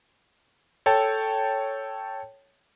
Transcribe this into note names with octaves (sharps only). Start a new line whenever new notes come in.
A4 C#5 G5 A5